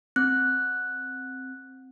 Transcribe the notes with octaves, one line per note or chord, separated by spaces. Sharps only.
C4 F#6